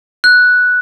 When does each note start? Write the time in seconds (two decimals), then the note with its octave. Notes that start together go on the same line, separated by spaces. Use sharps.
0.24 F#6